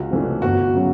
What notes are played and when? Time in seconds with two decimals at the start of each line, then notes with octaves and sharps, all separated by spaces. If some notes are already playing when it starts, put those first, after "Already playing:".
Already playing: C#2 F#4
0.11 C3 E3 A3 D4
0.42 G1 F#4
0.75 C#3 F#3